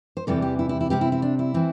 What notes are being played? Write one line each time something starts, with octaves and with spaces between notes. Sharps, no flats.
C5
E2 C3 E3 G3 A4
G4
E4
E4
E4
C3 G3 C4 G4
E4
E4
D4
E4
E3 C4